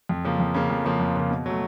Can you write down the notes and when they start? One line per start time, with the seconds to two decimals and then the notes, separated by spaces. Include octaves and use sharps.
0.09 F2
0.24 C#3 F3 A#3
0.40 F2
0.54 C#3 F3 A#3
0.70 F2
0.84 C#3 F3 A#3
1.00 F2
1.16 C#3 F3 A#3
1.31 B2
1.46 F#3 A3